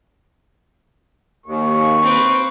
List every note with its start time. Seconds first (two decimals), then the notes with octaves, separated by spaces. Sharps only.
1.46 D#2 C#6
2.02 C4 B4